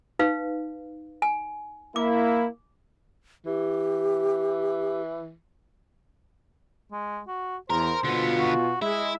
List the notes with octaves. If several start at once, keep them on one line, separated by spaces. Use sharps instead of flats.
D#4 B4 F5
G#5
A#3 E4 D6
E3 G4
G#3
F#4
E2 A#4 C5
B2 D3 B3 F4
F#4
G#3 E4 E5